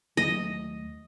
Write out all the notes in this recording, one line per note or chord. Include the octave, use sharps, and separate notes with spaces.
D#2 F#3 A3 D#5